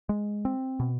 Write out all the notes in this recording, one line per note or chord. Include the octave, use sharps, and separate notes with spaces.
G#3
C4
B2